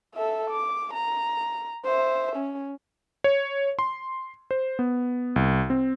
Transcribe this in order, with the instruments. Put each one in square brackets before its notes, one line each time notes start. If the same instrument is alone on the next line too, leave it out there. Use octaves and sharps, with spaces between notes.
[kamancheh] A4 E5
D6
A#5
C5 E5
C#4
[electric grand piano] C#5
C6
C5
B3
C2
C4